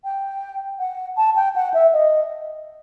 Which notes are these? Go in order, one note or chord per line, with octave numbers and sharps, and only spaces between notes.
G5
F#5
A5
G5
F#5
E5
D#5